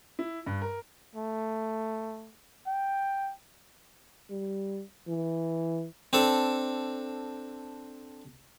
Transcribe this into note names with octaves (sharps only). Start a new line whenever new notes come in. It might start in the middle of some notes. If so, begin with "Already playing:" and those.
E4
G2
A#4
A3
G5
G3
E3
C4 D4 A4 A5